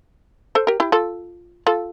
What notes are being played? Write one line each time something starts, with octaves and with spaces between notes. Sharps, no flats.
A4 C5
G4 A#4
E4 G4
F4 A4
F4 A4